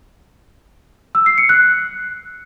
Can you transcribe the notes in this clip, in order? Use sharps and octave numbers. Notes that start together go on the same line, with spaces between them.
E6
C7
C#7
F#6